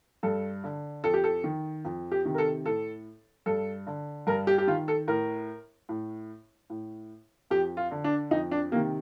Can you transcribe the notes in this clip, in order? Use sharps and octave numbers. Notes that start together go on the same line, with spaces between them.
G2 A4
D3
F2 A4
G4
A4
D#3
F2
G4
C3 D#3
A#4
A4
A2 A4
G2 A4
D3
G2 A#4
G4
G4
D#3 F4
A4
A2 A#4
A2
A2
F2 G4
F4
D3
D4
F2 D#4
D4
C3 D#3 A#3